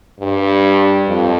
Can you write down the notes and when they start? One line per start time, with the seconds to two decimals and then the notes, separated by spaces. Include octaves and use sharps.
0.20 G2
1.09 F2